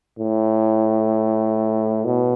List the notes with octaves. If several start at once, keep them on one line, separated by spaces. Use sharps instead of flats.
A2
B2